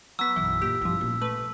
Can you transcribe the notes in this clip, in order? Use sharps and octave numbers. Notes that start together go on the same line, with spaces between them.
F#3 B3 E6 B6
B1 F#2 E3
A#2 G4
A1 G2 B2 F3
A#2 C#3
A3 B4